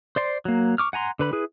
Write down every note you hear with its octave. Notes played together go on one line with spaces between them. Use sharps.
C5 D5 C6
F#3 A#3
C#6 D6 F6
F#5 G#5 A#5 C6
D3 B4 B5
E4 G#4 B4